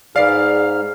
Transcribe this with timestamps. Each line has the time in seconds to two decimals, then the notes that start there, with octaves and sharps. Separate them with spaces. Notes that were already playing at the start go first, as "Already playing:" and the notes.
0.16 G#2 G#4 B4 D5 F5 F6 C7